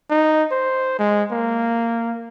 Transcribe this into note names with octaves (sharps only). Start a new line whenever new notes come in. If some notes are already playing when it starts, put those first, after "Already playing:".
D#4
C5
G#3
A#3